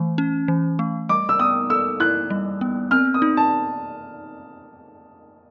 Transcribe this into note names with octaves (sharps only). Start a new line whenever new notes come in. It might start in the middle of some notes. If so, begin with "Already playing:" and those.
Already playing: E3 A3
C#4
E3
A3
G3 D6
E6
B3 D#6
A4 E6
E4 F#6
G3
B3
C4 F6
D#6
D#4
A5